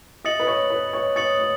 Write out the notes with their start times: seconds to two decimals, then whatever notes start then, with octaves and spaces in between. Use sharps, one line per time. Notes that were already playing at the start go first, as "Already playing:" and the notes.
0.25 D#5 D#6 A6 C#7 F#7
0.40 B4
0.47 C#5
0.70 B4
0.93 C#5
1.16 C#5 D#6 A6 C#7 F#7
1.40 C#5